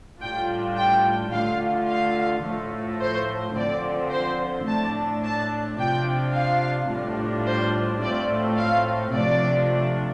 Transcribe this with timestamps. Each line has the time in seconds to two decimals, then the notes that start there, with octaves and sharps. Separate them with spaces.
0.21 A2 G3 D4 F4 G5
0.77 G5
1.32 D3 A3 F4 F5
1.88 F5
2.44 A2 F3 A3
3.00 C5
3.55 D3 F3 C4 D5
4.11 C5
4.67 A2 A3 D4 A5
5.23 A5
5.79 C3 F3 D4 F4 G5
6.35 F5
6.91 A2 G3 D4 F4
7.46 C5
8.02 A2 A3 C4 F4 D5
8.58 F5
9.14 C3 F3 A3 D4 F4 D5